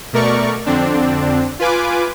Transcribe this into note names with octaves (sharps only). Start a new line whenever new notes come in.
B2 A3 A#4 D5 C#6
F2 D3 C4 D4
F4 B4 G#5 D6